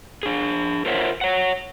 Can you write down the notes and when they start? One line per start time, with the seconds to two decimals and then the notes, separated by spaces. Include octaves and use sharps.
0.23 D4 G#4
0.86 F4 A#4 C5 C#5 E5 F#5
1.21 C#5 F#5